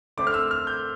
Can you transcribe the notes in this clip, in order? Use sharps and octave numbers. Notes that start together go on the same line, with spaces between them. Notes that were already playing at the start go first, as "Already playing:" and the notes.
D3 A3 C4 D6
F6
E6
F6
G6